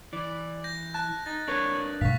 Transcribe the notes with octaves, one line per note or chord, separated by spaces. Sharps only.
E3 D5
G6 A#6
A5 F#6
D#4 A6
D4 A#4 B4 C#5
G2 B2 A3 F5 C#6 B6